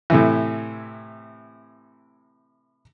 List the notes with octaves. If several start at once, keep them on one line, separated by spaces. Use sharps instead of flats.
A2 C3 E3